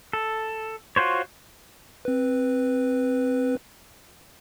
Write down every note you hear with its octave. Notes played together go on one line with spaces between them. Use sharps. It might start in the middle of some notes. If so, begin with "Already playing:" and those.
A4
F4 F#4 C5 C#5
C4 B4